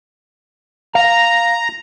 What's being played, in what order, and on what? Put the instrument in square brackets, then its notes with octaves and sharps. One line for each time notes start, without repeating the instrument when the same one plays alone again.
[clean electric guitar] F5 [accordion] A#5